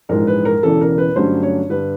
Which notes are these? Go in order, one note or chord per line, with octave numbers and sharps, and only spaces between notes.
A#1 G#2 E3 G#3 A#4
B4
A#4
E1 E2 C#3 E3 A4
A#4
B4
G2 D3 F#3 A3 C#4 C5
C#5
G2 D3 B4